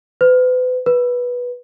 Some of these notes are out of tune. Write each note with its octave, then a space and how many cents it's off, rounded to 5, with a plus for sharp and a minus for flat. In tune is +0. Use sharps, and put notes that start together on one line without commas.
B4 +40
B4 -10